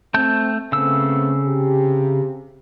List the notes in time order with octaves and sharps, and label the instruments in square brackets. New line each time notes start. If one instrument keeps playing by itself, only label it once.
[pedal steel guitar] A3 A5 G6 [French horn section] C4
[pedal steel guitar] C#3 E6 [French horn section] A3 B3 C4
[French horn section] C3 G4